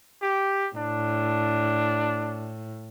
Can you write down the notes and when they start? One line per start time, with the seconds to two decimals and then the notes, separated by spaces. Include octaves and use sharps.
0.22 G4
0.76 A2 D4